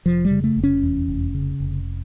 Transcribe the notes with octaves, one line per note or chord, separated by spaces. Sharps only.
F1 F3
G3
C#3
A3
F1
C#4
E2
F1
C#3
F1